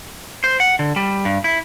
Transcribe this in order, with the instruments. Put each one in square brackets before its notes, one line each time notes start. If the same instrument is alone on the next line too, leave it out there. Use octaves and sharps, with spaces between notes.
[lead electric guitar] C5
F#5
D3
G3
G2
E4